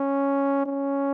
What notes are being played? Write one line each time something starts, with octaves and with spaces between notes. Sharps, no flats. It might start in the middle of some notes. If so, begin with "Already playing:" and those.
Already playing: C#4
C#4